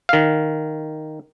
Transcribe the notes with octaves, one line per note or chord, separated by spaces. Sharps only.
D#3 F5